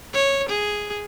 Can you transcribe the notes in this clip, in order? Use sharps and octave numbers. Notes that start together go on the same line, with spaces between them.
C#5
G#4